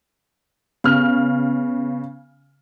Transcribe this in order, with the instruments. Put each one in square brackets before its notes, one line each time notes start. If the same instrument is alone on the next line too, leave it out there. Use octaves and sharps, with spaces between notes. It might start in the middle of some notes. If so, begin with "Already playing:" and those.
[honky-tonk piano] C#3 F6 [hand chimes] B3